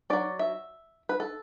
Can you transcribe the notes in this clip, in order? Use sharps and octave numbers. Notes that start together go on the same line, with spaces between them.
F#3 C#4 D5
E5
B4
A4